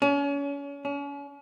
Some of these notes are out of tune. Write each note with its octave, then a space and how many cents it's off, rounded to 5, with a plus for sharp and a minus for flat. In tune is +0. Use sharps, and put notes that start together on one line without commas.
C#4 +35
C#4 +40